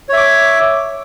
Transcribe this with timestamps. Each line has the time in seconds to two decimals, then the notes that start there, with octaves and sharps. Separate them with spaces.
0.09 C#5
0.13 E5
0.17 D6